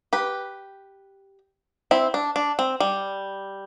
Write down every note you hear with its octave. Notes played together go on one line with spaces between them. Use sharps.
G4 B4
C4 E4
D4
D4
C4
G3